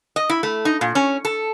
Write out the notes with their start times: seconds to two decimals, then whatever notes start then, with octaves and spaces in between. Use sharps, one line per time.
0.16 D#5
0.29 E4
0.43 A3
0.65 D#4
0.81 A#2
0.95 C#4
1.25 A4